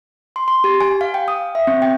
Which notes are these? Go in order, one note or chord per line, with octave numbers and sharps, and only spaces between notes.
C6
C6
G4
G#5
F5
G5
D#6
E5
C4
G5